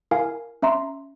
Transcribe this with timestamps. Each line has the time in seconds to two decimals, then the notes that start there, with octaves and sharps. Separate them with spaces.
0.11 E4 A#4 F5 G#5
0.62 C#4 E5 A#5 C6